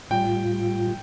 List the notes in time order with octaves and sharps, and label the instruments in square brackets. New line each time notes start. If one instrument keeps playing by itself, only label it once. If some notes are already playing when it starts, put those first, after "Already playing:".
[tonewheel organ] A2 G3 F4 [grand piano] G5